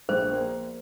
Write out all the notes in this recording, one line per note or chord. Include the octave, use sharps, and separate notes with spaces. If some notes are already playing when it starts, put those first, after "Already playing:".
A#1 C5
A#3